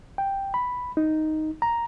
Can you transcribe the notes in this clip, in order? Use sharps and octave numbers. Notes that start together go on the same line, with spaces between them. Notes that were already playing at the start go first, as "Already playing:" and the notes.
G5
B5
D#4
A#5